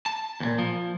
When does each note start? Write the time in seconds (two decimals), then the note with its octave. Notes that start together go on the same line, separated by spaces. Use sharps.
0.06 A5
0.40 D#2 A#2
0.59 F3